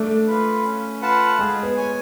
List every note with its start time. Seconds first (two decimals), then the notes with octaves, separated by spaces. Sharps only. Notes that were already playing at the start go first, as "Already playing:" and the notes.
Already playing: A3 D4
0.27 F4 B4
0.64 C#4
1.02 F4 B4 F#5 A5
1.39 G#3 G#4
1.63 B3
1.77 C#5 G#5